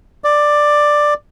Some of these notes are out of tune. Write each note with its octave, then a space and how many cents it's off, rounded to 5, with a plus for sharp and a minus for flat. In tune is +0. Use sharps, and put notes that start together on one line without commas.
D5 +10